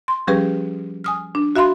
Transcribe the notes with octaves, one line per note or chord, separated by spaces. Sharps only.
C6
F3 G3 C#4 G4 G#4 B4
G#5 D#6 F6
D4
F#4 E5 F5 B5 C6